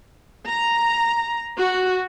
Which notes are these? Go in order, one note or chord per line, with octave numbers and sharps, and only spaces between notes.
A#5
F#4